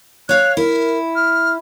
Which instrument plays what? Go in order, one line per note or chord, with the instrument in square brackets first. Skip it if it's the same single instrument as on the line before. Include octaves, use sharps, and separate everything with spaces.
[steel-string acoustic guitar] C#5 F5 [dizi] F#6
[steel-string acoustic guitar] E4 [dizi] A#4
[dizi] F6